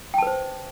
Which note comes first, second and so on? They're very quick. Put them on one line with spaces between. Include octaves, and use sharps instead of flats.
G5 A5 B4 C5